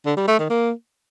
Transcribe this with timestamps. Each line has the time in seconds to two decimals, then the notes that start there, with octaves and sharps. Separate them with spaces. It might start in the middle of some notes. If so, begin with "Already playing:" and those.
0.06 D3
0.17 G3
0.28 A3
0.39 D#3
0.50 A#3